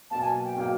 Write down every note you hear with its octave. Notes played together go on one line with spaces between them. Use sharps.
B2 F#3 A#3 A5
G#5
G5
B2 F#3 A#3 G5